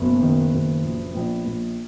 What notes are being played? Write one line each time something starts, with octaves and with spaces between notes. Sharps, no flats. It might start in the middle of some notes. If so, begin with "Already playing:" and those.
Already playing: F#1 B1 B3
D#3
F#1
A#1
A#1
A#1